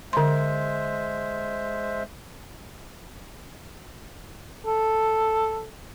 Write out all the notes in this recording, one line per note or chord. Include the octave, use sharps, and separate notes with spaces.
D3 G#3 C5 E5 C6
A4